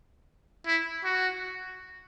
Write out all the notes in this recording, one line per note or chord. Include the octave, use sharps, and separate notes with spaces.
E4
F#4